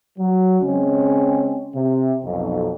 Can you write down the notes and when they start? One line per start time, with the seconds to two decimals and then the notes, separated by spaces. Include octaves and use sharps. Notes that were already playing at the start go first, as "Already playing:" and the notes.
0.19 F#3
0.62 C#3 G#3 C4 C#4
1.75 C3
2.24 B1 F2